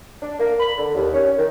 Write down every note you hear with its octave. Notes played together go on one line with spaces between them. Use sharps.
D4
A#3
B5
D3
D#2
C#4
D#3